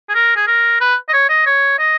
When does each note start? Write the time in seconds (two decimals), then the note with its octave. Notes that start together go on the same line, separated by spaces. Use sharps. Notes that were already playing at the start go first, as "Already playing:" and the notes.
0.09 G#4
0.14 A#4
0.36 G#4
0.47 A#4
0.80 B4
1.09 D#5
1.13 C#5
1.29 D#5
1.46 C#5
1.79 D#5